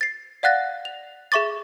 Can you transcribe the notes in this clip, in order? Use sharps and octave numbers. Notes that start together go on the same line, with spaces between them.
A6 C7
D5 F5 F#5 F#6 A6 A#6
F7
G#4 E5 C#6 D6 A6